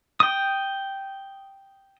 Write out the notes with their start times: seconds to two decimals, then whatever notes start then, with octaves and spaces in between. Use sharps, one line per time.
0.20 G5 D#6